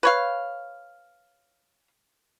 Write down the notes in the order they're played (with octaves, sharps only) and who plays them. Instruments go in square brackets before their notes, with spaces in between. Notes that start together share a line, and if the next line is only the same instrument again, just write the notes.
[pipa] B4 C#5 F5